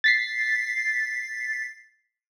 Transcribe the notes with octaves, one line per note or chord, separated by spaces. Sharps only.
A6 B6 C7